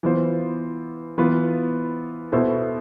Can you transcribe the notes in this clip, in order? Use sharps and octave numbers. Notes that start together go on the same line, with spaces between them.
E3 B3 F4 C5
E3 B3 F4 B4
B2 B3 E4 A4 C5